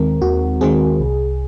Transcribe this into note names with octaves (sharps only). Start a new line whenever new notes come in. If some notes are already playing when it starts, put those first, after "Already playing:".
Already playing: D#2 D#3 G#3 C4 A#4
D#2 F#4
D#3 G#3 C4 G#4
C2